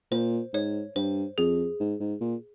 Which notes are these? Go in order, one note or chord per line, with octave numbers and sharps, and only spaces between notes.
A#2 C5
G#2 C#5
G2 C5
F2 G#4
G#2
G#2
A#2